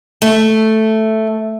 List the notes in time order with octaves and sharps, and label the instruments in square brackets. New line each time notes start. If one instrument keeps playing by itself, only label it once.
[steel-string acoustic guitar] A3